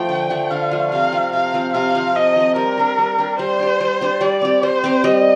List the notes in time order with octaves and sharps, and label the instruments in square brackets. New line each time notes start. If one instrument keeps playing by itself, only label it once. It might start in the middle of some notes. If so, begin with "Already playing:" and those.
Already playing: [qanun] F3 A3 [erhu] G5
[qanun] D3
F3 A3
[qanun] D3 [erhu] F5
[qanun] F3 A3
[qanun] C3 [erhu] F5
[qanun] F3 C4
[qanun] C3 [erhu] F5
[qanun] F3 C4
[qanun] C3 [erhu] F5
[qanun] F3 C4
[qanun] C3 [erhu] D#5
[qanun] F3 C4
[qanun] G3 [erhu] A#4
[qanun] D4 G4
G3
D4 G4
[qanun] G3 [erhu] C5
[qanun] D4 G4
G3
D4 G4
[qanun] G3 [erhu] D5
[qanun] C4 G4
[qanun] G3 [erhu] C5
[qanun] C4 G4
[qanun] G3 [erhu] D#5